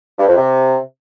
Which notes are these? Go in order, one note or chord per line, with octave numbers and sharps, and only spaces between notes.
G2
F2
C3